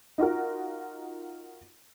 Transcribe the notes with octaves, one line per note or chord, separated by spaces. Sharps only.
D#4 F4 F#4 A#4